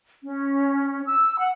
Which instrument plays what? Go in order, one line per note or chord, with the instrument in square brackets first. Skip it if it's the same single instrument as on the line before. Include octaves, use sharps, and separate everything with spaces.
[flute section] C#4
E6
F#5